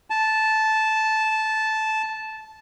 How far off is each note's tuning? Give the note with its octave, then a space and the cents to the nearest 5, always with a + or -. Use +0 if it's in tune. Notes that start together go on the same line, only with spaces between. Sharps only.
A5 -10